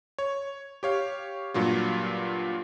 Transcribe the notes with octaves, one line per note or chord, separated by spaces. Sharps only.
C#5
G4 C#5 F5
G2 A#2 F#3 F4